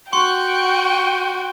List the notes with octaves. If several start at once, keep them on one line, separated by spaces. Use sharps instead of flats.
F#4 G5 C6 C#6